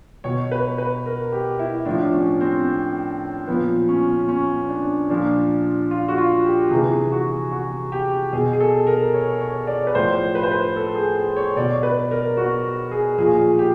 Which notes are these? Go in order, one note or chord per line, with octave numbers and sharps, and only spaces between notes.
B2 C#5
B4
B4
A#4
G4
E4
A2 F3 D4
C#4
C4
A#2 F3 B3
C#4
C#4
D4
A#2 F3 D4
F4
F#4
F4
G4
C3 E3 G#4
F#4
F#4
G4
B2 G#4
G#4
A4
A#4
C#5
C#5
D5
B4
A2 F3 C5
B4
C5
B4
A4
G#4
G#4
C#5
B2 D5
B4
A#4
F#4
G#4
A#2 F3 G#4
G4